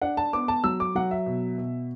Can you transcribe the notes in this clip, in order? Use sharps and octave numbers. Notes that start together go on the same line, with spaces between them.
D4 F#5
A5
B3 D6
A5
F#3 E6
D6
F#3 F#5
E5
B2
B2